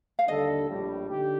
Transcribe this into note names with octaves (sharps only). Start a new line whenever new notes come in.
F5
D#2 D3 G3 D4 A4 D#5
A#1 A2 G3
D3 D#4 G4